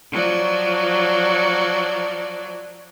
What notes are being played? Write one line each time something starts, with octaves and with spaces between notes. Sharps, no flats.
F3 F#3 D5